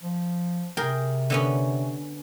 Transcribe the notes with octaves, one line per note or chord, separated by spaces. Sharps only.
F3
C3 G#4 A#4 G5
D3 B3 C#4